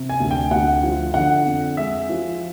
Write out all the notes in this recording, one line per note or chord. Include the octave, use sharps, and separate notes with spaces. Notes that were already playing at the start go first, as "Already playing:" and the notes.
Already playing: C3
G#5
D2
G5
D2 F#5
F3
D3 F#5
F2
G#3 E5
F3